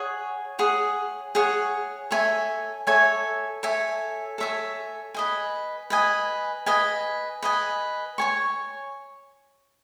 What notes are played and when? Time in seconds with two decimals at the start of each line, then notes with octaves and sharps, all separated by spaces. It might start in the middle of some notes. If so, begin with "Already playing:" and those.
Already playing: G#4 C#5 F#5
0.59 G#4 C#5 F#5
1.35 G#4 C#5 F#5
2.11 A4 C#5 E5 G#5
2.87 A4 C#5 E5 G#5
3.63 A4 C#5 E5 G#5
4.38 A4 C#5 E5 G#5
5.14 B4 D#5 G#5
5.90 B4 D#5 G#5
6.66 B4 D#5 G#5
7.43 B4 D#5 G#5
8.18 C#5 G#5 C#6